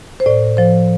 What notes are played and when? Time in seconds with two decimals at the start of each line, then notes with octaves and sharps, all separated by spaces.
0.20 C5
0.26 A2 D5
0.57 F3 C5